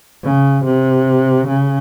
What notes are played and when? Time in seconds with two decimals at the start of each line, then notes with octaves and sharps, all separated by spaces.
0.24 C#3
0.65 C3
1.48 C#3